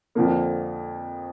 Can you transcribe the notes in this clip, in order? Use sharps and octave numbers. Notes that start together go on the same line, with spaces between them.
F2 D3 F3 A#3